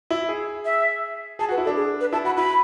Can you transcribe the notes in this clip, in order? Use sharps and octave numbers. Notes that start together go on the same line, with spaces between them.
E4
G#4
E5
G#4 A5
F#4 B4
E4
A4
D4
G#4
B4
E4 A5
F#4 B5
E4 B5